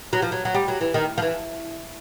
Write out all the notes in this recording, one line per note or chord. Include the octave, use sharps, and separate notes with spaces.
F#3
F3
F#3
F#3
G3
F#3
E3
D#3
F3
E3